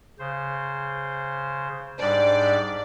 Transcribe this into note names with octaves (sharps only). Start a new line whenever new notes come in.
C#3 C5
G#2 G3 D4 D5